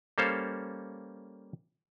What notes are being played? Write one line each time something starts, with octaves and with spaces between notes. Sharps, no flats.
G3 A#3 C#4 A4 C5 F5